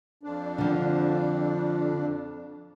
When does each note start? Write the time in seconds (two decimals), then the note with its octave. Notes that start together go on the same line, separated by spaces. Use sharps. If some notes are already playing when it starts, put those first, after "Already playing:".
0.23 F2 D4
0.58 D3 F3